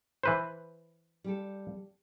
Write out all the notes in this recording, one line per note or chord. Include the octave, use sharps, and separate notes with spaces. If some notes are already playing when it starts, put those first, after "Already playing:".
E3 B4 C5
G3 G4 A4